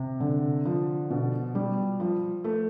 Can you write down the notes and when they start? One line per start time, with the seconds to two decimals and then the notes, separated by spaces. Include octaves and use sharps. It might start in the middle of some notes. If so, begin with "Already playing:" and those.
Already playing: C3
0.20 D3
0.65 F3
1.10 B2
1.55 G3
2.00 F3
2.44 A3